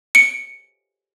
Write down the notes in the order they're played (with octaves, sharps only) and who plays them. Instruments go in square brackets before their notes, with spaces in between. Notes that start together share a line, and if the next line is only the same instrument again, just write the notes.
[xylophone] C#7 D7